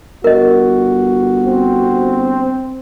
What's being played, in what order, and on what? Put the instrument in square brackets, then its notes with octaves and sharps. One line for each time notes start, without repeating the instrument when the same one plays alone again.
[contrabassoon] G1 [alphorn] F#4 [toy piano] A#4 D#5
[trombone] C4